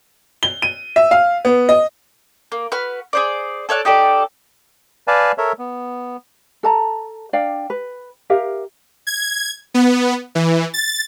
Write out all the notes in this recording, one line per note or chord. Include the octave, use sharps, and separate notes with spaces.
G7
D#7
E5
F5
B3
D#5
A#3
F#4 B4 F6
G#4 C5 D5
A4 C#5 D5 F#6
D#4 G4 A4 D5
B4 D5 F5 G#5 A5
A4 A#4 C#5 E5
B3
A4 A5 A#5
D4 D5 F5 G5
B4
G4 A#4 E5 F5
G#6
B3
E3
A6